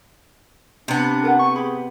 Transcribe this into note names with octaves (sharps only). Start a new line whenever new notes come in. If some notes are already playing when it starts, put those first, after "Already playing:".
C3 B3 D4
A4 A#4 F#5
C#6
G4 G#4 B5